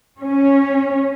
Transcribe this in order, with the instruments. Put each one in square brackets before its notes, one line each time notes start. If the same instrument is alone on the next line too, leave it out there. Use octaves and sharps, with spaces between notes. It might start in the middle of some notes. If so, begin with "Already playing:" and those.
[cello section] C#4